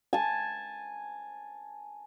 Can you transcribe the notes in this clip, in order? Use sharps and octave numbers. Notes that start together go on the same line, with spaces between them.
G#5 A5